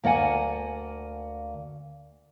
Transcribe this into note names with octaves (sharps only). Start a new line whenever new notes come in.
D2 A#3 D5 F#5 G#5